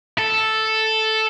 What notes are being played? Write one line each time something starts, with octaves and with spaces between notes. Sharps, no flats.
A4